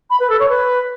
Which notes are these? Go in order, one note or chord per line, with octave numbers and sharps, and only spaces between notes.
B5
B4
A4
C#5
B4